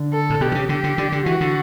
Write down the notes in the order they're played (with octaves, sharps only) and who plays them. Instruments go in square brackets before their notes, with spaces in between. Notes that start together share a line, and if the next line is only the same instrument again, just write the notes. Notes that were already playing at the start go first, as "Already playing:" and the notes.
Already playing: [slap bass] D3
[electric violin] A4
[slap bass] A2
[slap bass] B2 [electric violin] G4
[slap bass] D3
C#3
[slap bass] D3 [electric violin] G4
[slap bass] D3
D3
D3
[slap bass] E3 [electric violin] F#4
[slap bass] D3